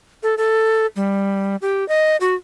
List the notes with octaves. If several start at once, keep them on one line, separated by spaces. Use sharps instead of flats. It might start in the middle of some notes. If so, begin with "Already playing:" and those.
A4
A4
G3
G4
D#5
F#4